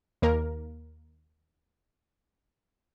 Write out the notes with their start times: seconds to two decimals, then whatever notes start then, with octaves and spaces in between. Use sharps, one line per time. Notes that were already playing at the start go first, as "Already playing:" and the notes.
0.22 D#2 A#3 A#4